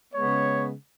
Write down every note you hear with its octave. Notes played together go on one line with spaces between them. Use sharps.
C#3 G#3 B3 C#5